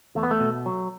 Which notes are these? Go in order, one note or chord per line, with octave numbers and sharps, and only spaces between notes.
E2 A3
B3
A3
B2
F#3